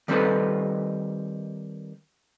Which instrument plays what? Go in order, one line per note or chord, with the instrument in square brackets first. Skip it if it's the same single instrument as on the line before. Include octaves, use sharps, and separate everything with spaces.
[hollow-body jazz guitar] D#3 G3 C4 D#4 A4 B4